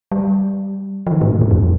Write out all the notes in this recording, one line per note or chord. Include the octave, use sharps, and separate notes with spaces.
G3
F3
D#3
A2
A#2
G2
F2